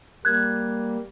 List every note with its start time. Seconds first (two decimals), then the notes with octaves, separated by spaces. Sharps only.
0.25 G3 A#3 F#6 G#6